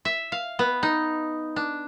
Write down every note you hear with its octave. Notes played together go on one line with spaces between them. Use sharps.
E5
F5
B3
D#4
D4